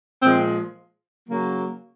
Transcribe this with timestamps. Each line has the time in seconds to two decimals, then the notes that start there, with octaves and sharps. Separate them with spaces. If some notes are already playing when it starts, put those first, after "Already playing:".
0.22 A#2 F3 G#3 C4
1.28 C#3 F#3 A#3